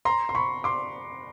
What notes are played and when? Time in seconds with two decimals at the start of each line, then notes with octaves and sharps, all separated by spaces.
0.05 A#5 C6
0.29 C6
0.35 B5 C#6
0.64 C6 D6